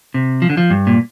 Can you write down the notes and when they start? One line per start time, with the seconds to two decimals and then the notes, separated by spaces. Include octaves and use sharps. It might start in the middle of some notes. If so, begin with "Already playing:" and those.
0.14 C3
0.42 F3
0.50 D3
0.57 F3
0.70 G2
0.87 A#2